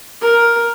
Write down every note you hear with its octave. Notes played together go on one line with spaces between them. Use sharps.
A#4